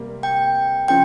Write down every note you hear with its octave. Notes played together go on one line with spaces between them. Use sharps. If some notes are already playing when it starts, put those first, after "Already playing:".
Already playing: C3 G3 A#3
G5
C#3 F3 G5